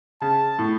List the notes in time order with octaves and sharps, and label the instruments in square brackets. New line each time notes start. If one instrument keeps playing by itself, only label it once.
[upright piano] C#3 [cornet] A5
[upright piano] A2